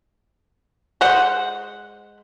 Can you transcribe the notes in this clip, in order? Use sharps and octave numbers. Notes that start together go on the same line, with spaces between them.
G#3 C5 F#5